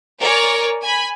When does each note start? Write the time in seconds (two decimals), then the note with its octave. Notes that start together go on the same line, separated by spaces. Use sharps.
0.21 A#4 C#5 D5 G#5
0.82 G#5 B5